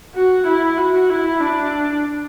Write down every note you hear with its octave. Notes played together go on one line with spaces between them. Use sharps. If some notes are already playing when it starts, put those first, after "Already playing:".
F#4
E4
F#4
E4
D4